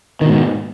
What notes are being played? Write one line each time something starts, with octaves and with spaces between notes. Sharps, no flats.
G#2 B2 D#3